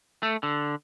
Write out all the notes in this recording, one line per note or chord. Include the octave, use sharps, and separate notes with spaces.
A3
D3